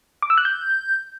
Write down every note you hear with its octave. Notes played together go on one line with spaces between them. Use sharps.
D6
E6
F#6
G6